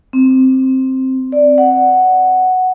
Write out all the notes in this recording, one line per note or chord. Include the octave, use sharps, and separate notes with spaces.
C4
D5
F#5